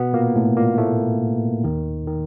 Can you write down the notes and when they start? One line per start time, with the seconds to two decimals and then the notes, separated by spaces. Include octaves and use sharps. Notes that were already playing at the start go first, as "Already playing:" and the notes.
Already playing: B2 B3
0.13 A#2 A#3
0.36 A2 A3
0.56 A#2 A#3
0.78 A2 A3
1.64 D#2 D#3
2.07 D#3